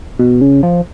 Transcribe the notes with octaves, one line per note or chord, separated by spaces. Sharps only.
B2
C#3
F3